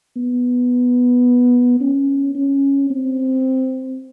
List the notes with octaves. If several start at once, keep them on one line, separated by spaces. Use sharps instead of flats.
B3
C#4
C#4
C4